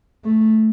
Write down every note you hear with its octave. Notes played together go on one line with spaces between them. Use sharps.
A3